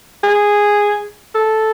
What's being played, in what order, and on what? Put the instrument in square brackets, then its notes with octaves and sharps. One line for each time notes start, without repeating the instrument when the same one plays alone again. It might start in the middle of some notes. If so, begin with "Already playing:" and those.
[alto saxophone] G#4
A4